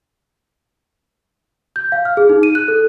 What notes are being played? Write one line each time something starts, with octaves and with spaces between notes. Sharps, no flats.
G6
F5
F6
G#4
D#4
D#7
F#6
A4